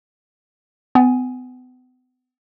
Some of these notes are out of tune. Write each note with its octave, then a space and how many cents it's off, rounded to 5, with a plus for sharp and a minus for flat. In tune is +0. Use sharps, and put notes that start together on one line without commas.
B3 +40 G#5 +0